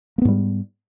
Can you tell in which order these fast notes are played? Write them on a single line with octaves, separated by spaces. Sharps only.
A#3 B3 G#2 G3